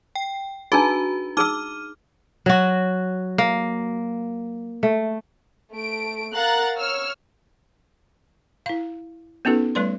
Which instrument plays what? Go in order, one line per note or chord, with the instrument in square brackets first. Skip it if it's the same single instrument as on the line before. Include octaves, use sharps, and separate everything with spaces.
[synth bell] G5
[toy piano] D4 D#4 G#4 [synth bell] F#4 B4 A#5
[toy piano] D#4 G#4 E6 [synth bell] D6 F6 D#7
[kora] F#3 F#4
A#3
A3
[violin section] A3 D7
A#4 F5 F#5 A#5 F#6 A6
C#5 E6 F6
[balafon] E4 F5
B3 C#4 D#4 F#4 A4 B4
G3 A3 B4 D5 C6